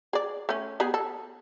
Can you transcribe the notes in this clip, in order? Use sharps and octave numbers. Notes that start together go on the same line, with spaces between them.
G#4 D5
A3 C#4
B3 G4 G#4
A4